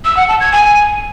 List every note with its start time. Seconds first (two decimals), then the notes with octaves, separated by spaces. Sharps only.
0.05 E6
0.17 F#5
0.29 A5
0.40 G#6
0.52 G#5